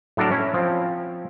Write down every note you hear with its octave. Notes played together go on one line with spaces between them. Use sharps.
A2 F#3 D4 A4 A#4
C#4 E4
F3 C4